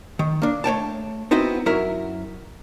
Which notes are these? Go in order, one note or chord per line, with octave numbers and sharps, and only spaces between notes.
D#3
A#3 D4
A3 C#5 G5 A5
B3 C4 D#4 E4 F#4
F#2 F#3 E4 A#4 E5